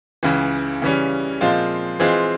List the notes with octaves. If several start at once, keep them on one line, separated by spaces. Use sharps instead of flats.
C#2 C#3 E3
C#3 E3 G3 C#4
A#2 F3 G#3 C4 F4
E3 G#3 C4 F4 G#4